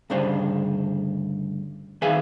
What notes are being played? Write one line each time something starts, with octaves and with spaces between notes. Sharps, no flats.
D2 G2 C#3 D4 C5
D#3 G#4 B4 E5 F5 G#5